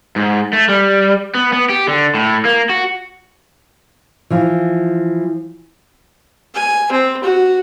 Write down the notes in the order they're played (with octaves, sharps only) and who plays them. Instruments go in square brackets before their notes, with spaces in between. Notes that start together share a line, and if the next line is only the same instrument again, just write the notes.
[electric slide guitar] G#2
A3
G3
B3
B3
G4
D3
A2
A#3
F#4
[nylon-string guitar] E3 F3
[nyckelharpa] G#5
C4
F#4